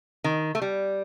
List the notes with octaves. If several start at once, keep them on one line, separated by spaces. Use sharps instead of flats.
D#3
A3
G3